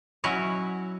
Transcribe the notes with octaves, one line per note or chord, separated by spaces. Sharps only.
F#3 C#4 E4 F#4 C#5 D#5